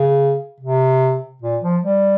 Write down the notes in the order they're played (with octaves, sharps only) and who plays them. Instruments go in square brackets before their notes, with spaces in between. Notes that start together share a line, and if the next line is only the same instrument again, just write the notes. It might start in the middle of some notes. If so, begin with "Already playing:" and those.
Already playing: [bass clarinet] C#3
C3
A#2
F3
G3